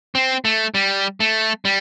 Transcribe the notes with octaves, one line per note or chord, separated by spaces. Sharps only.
C4
A3
G3
A3
G3